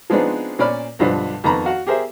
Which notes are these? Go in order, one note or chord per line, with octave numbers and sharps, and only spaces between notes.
F3 G#3 B3 C4 D4 D#4
A#2 C#4 C5 D5 B5 F6
B1 G2 D3 F3 D4 B4
F2 D#3 B3 A#5 B5
F#4 F5 F#5
G4 G#4 A#4 C5 E5